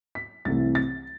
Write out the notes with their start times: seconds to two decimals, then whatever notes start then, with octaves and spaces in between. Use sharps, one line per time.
0.15 B6
0.45 C2 C3 E3 A3 A6
0.75 A6